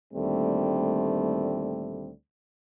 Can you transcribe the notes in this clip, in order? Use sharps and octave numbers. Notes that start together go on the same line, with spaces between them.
D2 A#2 D#3 G3 A3 C4